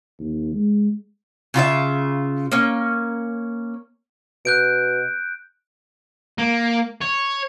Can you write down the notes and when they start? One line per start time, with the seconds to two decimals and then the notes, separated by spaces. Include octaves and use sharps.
0.19 D#2
0.54 G#3
1.54 C#3 F4 G4 E5
2.52 A#3 C#4
4.45 B2 F#6 G6 D7
6.38 A#3
7.01 C#5